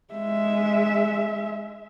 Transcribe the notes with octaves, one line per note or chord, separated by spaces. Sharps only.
G#3 E5